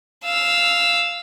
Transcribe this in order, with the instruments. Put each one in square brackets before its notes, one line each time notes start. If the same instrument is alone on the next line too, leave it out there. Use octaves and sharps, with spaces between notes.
[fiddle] F5 E6